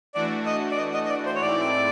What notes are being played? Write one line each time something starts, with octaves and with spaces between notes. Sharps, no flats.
E3 A3 D4 F#4 D5
D#5
D5
D#5
D#5
D#5
D5
C5
C#5
G#2 E3 A3 C4 E4 D5